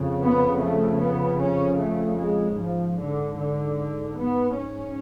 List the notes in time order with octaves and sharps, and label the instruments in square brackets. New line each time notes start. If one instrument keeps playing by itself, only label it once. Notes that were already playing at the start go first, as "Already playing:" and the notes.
Already playing: [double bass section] F2 C#3
B3
A3
B3
C#4
A3
G#3
G#2 F3
D3
D3
B3
C#4